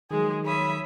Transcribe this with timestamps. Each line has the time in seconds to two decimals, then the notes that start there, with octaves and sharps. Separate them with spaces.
0.11 D#3 F3 F#3 G#3 G#4
0.46 C#5 E5 B5 D#6